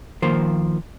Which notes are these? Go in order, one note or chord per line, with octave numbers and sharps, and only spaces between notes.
D#3 F3 A#3 C5